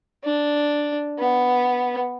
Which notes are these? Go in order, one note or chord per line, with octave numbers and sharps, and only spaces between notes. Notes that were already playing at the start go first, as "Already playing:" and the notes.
D4
B3